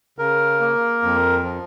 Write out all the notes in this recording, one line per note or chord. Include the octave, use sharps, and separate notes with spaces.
C#3 A#4
A#3
F2
F3